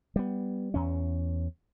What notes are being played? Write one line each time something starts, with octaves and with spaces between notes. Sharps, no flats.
G3 B3
E2 C#4